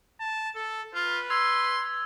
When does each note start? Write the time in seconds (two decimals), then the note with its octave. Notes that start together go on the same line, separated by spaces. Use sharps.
0.20 A5
0.55 A4
0.94 F4 B4
1.30 C6 E6 G#6 F7